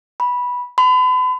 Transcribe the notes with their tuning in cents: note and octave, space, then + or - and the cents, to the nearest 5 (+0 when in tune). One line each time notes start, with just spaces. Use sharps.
B5 -10
B5 +40